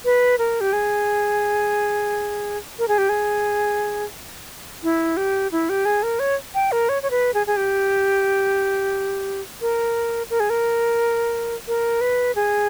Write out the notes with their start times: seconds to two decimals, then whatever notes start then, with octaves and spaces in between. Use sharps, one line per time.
0.05 B4
0.38 A#4
0.61 G4
0.73 G#4
2.79 A#4
2.88 G#4
2.98 G4
3.09 G#4
4.83 E4
5.17 G4
5.52 E4
5.69 G4
5.85 G#4
6.03 A#4
6.19 C#5
6.54 G5
6.72 A#4
6.89 C#5
7.03 C#5
7.11 B4
7.34 G#4
7.47 G#4
7.57 G4
9.61 A#4
10.30 A#4
10.40 G#4
10.50 A#4
11.68 A#4
12.01 B4
12.35 G#4